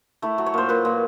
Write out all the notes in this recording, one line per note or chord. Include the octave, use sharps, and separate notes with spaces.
A3 E4
F#3
C#5
A#2 C5
A#2 B4
A#2